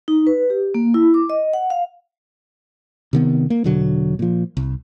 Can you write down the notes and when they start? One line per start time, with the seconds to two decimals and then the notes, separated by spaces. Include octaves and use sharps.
0.08 D#4
0.27 B4
0.50 G4
0.74 A#3
0.94 E4
1.14 D6
1.30 D#5
1.53 F#5
1.70 F5
3.13 C3 D#3 B3
3.50 A#3
3.64 E1 B2 D3 F#3
4.19 A#2 F3
4.57 C2